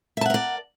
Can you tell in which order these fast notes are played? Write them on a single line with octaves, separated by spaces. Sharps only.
E5 A5 F#5 A#4 D5